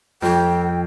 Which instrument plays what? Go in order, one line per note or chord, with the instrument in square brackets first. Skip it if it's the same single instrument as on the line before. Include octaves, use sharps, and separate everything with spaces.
[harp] F2 [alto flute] A4 [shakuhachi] G5